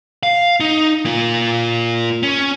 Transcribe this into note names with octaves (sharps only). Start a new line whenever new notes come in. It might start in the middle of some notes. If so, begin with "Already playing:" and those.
F5
D#4
A#3 F4
C#4